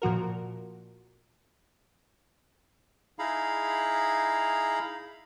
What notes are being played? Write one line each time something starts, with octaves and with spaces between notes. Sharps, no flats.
A#2 F3 F#4 A#4
D#4 E4 G#4 F5 A#5 B5